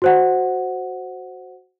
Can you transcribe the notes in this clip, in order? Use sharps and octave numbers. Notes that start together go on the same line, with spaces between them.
F#4 C5 F#5